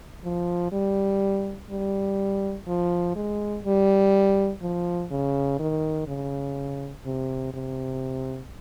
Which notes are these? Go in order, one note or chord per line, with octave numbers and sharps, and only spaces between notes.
F3
G3
G3
F3
G#3
G3
F3
C#3
D#3
C#3
C3
C3